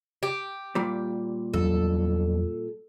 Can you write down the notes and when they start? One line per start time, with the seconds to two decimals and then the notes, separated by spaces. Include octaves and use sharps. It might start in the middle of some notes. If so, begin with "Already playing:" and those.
0.23 G4
0.75 A#2 G3
1.53 E2 F3 F#3 A4